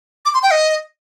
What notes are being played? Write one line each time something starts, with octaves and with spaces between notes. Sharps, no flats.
D6
C6
G5
D#5